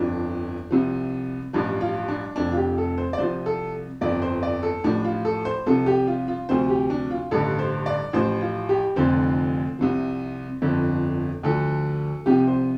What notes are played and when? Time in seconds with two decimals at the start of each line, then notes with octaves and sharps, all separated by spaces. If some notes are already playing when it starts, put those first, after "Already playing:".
Already playing: G1 F2 F3 D4
0.71 C2 C3 F3
1.53 A1 G2 F3 D4
1.81 F4
2.08 D4
2.36 F1 F2 F3 D4
2.52 F4
2.57 G4
2.78 A4
2.98 C5
3.13 D5
3.18 C2 C3 F3 C5
3.46 A4
4.01 G1 F2 F3 D5
4.22 C5
4.43 D5
4.63 A4
4.84 A1 A2 F3 D4
5.04 F4
5.25 A4
5.45 C5
5.66 C2 C3 F3 A4
5.86 G4
6.07 F4
6.28 F4
6.49 D2 C3 F3 C5
6.69 G4
6.90 D4
7.11 F4
7.31 A1 G2 D3 A4
7.59 C5
7.86 D5
8.13 A1 A2 F3 C5
8.41 F4
8.69 G4
8.96 F1 F2 D3 F3 C5
9.79 C2 C3 F3
10.62 G1 F2 D3 F3
11.43 D2 D3 F3 A4
12.26 C2 C3 F3 G4
12.48 C5